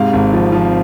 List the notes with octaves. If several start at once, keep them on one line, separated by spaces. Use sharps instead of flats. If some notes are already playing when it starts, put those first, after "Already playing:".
Already playing: G#2 C3 F5
G#1
F3
F3